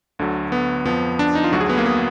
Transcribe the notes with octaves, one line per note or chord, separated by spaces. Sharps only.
D2 D3 F#3
B3
F2 F3 B3
D4
D#4
F4
D2 D3 F#3 F#4
G#4
B3
A#3
B3